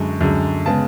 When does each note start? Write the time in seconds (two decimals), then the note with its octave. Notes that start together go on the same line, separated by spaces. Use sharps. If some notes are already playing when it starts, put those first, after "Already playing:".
Already playing: F#2 D3 G#3 C#6
0.21 F#2 D3 G#3
0.66 C#3 G#3 B3 A5